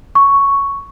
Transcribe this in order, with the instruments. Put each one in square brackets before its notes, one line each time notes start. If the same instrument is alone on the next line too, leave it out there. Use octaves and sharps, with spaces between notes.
[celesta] C#6